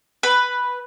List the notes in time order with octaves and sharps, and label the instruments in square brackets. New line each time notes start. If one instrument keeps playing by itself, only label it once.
[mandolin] B4